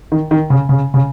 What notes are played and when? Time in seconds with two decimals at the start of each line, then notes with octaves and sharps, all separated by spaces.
0.12 D#3
0.31 D#3
0.50 C#3
0.69 C#3
0.94 C#3